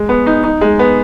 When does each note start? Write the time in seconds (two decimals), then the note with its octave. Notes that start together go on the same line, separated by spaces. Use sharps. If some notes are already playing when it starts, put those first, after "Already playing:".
Already playing: G#3
0.09 B3
0.26 D#4
0.44 D#4
0.61 G#3
0.79 B3